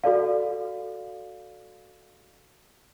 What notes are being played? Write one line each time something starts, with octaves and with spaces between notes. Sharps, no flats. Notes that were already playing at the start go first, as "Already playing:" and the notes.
F#4 A4 D5 F5